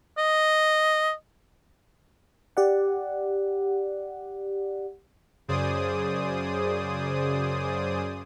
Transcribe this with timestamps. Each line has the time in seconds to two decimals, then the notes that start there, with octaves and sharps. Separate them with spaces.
0.18 D#5
2.57 G4 D5 F#5
5.48 F#2 C#3 G#4 C5 D5 D#6